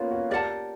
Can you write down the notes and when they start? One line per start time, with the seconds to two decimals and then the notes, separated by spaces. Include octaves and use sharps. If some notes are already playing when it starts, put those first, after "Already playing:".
Already playing: A#3 B3 C#4 F4
0.11 F#4
0.30 G4 A#4 D5 F#5 A5